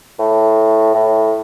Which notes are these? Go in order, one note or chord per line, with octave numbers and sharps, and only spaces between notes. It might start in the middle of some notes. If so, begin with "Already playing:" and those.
A2
A2